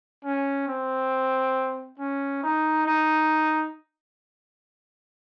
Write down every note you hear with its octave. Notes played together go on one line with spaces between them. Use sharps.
C#4
C4
C#4
D#4
D#4